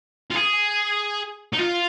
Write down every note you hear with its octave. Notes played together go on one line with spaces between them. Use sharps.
F4
G#4
D#4
F4